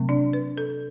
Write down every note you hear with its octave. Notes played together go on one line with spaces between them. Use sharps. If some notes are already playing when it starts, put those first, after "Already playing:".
Already playing: C3 F#3 A3 C4
D4 D5
B4
A4